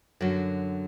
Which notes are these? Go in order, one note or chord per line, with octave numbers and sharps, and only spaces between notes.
F#2 D3 F#3